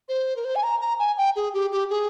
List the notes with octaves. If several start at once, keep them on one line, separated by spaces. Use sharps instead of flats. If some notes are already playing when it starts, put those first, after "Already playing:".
C5
A#4
C5
G#5
A#5
A#5
G#5
G5
G#4
G4
G4
G#4